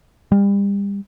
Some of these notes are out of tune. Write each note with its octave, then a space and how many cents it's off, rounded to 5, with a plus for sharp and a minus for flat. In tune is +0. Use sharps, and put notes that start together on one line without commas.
G3 +35